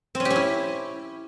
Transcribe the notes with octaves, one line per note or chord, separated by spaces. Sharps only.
C4
C#4
G4
C#4
E4